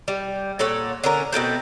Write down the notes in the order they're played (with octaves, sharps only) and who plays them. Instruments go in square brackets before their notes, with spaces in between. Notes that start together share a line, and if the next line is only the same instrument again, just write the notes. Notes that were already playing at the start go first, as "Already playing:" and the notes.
[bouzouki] G3
A#2 A4 C#5 F#5
D3 C#4 A#4
B2 D#3 A3 C4